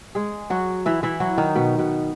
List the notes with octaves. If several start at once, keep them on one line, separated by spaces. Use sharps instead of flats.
G#3 G#4
F#3 F#4
E3 E4
E3 E4
F#3 F#4
D#3 D#4
B2 B3
B2 B3